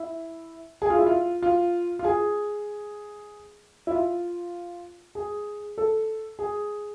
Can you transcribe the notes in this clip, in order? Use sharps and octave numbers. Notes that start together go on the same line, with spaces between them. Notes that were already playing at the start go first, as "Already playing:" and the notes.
Already playing: E4
G#4
F4
E4
F4
F4
F4
G#4
E4
F4
G#4
A4
G#4